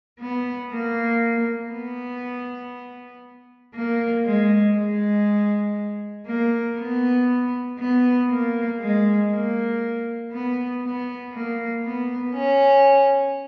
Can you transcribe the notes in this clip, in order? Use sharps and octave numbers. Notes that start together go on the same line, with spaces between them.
B3
A#3
B3
A#3
G#3
G#3
A#3
B3
B3
A#3
G#3
A#3
B3
B3
A#3
B3
C#4